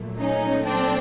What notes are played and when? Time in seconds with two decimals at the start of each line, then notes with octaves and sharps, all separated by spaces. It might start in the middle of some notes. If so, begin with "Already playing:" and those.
Already playing: A#2 F#3 A3
0.20 C#4 D#4
0.65 C4 D4